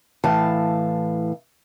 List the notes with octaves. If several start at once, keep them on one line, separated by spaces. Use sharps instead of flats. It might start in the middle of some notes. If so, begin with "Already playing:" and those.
A2 E3 F5 A5